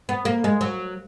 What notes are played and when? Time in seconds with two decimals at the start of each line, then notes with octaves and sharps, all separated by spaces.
0.09 B3
0.25 A#3
0.44 G#3
0.61 F#3